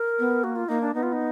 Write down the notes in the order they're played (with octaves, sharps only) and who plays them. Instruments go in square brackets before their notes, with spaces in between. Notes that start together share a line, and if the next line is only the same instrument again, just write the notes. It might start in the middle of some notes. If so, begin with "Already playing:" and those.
Already playing: [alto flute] A#4
[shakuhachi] B3
[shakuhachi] A#3 [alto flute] F#4
[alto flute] F4
[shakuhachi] A#3 [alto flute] D#4
[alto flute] D4
[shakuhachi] B3 [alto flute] D#4
[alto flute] F4
D#4